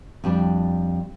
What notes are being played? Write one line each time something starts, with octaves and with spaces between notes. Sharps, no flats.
F2 G3 D4